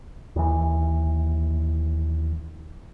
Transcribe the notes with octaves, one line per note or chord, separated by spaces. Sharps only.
D#2 E3